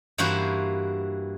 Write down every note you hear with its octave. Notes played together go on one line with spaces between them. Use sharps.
G2 E3 A#3 E4 F#4 C5